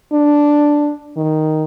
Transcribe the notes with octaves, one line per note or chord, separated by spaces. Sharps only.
D4
D#3